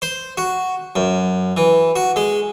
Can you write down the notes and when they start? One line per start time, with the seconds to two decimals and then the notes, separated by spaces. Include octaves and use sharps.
0.02 C5
0.37 F#4
0.96 F#2
1.57 E3
1.96 F#4
2.16 G#3